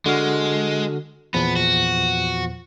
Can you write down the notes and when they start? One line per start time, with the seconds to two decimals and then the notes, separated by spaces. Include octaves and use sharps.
0.06 D3 G#3 F#4 F6
1.34 E2 A#2 F3 B3
1.56 F#4